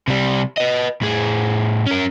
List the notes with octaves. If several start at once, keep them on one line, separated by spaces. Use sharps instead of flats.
C3 G3
B4 D#5
A2 G#4
C#4 A#4